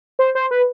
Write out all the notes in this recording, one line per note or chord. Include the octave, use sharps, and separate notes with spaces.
C5
C5
B4